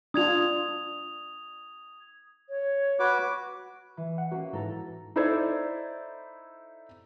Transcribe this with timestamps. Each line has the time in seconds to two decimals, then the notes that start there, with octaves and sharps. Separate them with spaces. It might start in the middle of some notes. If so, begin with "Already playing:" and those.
0.14 D4 F4 D#6 G#6 F7
2.49 C#5
2.99 F#4 B4 D6
3.97 E3
4.18 F#5
4.32 A#3 C#4 F#4
4.53 G#2 E3 A4 A#5 A6
5.16 D#4 E4 A4 C5 D5 G#6